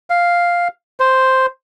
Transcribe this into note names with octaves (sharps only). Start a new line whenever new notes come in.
F5
C5